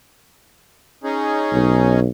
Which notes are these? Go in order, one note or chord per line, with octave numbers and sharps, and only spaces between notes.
C#4 D#4 G#4
B1